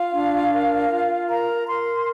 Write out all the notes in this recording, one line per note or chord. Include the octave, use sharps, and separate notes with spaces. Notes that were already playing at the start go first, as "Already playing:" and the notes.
Already playing: F4 F5
D4
A#4
F4
A#4 A#5
A#4 C6